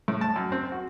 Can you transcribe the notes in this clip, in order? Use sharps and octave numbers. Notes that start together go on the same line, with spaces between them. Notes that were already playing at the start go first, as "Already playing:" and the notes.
A2
A5
F#2
C4
F#4